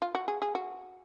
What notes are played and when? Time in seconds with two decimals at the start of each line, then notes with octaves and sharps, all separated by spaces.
0.02 F4
0.15 F#4
0.28 G#4
0.42 G#4
0.55 F#4